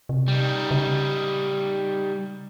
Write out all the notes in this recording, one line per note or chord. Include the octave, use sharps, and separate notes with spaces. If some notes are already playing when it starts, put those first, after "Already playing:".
C3
G3 D#4
C#3